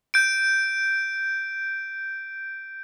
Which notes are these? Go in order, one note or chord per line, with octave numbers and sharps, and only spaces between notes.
G6 D7